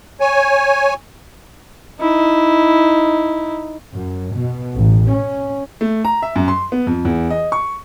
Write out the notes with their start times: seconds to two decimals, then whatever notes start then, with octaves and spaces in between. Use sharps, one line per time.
0.20 C#5 G#5
2.00 D#4 E4
3.93 F#2
4.35 B2
4.77 A1
5.11 C#4
5.81 A3
6.05 A#5
6.22 E5
6.36 F#2
6.48 C6
6.72 B3
6.87 F2
7.05 E2
7.30 D#5
7.52 C#6